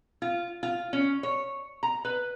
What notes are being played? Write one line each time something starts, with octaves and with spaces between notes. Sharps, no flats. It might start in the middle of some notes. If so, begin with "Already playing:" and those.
F4
F4
C#4
C#5
A#5
B4